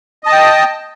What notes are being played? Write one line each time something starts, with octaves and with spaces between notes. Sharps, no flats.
D#5 G5 A5 D#6